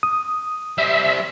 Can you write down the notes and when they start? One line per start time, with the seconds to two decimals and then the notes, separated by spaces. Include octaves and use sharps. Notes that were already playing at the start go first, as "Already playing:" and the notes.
0.03 D#6
0.78 G3 C5 E5